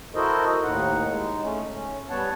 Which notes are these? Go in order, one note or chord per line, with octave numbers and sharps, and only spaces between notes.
E4 F#4 A4 A#4 C5 D#5
D#2 A2 D#4 F#5
G#3 D#4
A3 C#4
C#4
G3 B3 C#5 F#5 A5